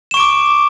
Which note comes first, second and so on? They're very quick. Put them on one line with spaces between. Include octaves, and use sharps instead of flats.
E7 C#6 D7 D6